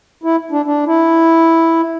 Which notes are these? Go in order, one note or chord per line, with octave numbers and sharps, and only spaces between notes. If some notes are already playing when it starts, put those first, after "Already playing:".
E4
D4
D4
E4